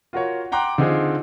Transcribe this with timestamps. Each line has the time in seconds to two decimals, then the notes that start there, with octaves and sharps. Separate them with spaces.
0.13 F4 F#4 A#4 C#5
0.52 F#5 G5 A#5 C6 D6 F#6
0.78 D3 C4 D#4 F4 G#4